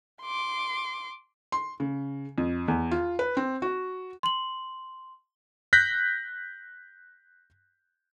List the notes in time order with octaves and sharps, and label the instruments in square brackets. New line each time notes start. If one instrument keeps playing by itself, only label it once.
[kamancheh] C6 D6
[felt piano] C6
C#3
F2
E2
F4
B4
C4
F#4
[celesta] C6 F#7
[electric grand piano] F#6 G6 A#6 B6